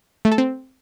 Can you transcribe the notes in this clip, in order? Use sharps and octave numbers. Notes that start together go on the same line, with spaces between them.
A3
A4
C4